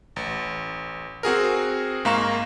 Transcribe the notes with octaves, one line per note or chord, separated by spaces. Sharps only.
A1
C4 F#4 G#4 A#4
G#2 A#3 F5 A#5 C#6 E7